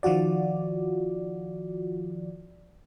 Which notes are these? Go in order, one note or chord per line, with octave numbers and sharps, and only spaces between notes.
D#3 F3 F4 F#4 D5